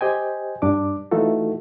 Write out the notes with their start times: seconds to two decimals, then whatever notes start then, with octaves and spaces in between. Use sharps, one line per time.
0.01 G4 C5 D#5 G5 G#5
0.62 G2 D4 D6
1.11 E3 A3 D#4 F4 F#4 A4